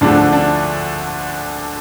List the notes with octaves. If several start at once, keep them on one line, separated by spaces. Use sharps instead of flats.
D2 D3 F3 A3 D4
D4